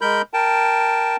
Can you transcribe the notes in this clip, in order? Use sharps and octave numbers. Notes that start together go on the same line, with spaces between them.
G#3 A#4 B5 G6
A#4 G5 A5